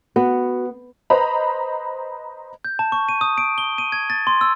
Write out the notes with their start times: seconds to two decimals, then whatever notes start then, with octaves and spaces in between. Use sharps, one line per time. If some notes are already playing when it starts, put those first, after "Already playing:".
0.16 B3 F#4
1.10 B4 C5 D#5 A#5 B5
2.65 G6
2.79 A5
2.92 C#6
3.09 D#7
3.21 D#6
3.38 D7
3.58 G7
3.78 D#7
3.92 G#6
4.10 A6
4.27 C6
4.41 E6